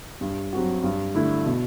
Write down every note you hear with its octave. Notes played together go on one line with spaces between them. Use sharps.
G2
F#3 C4 F#4
G2
D3 A3 E4
B2